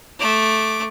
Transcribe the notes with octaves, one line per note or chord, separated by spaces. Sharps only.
A3 D6